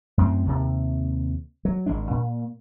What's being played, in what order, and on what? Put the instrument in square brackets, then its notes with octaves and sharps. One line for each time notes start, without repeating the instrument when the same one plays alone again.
[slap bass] F#2 A2 C4
D#2 C3
F#3
G#1 G#3 D4
A#2